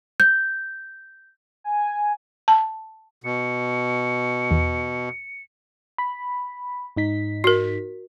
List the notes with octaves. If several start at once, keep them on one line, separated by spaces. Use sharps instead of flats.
G6
G#5
A5
B2 C#7
E2
B5
G#2 D#4 B6
F#4 A#4